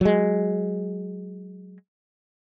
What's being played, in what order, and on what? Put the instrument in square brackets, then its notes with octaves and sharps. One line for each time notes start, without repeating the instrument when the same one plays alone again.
[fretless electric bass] F#3 G#3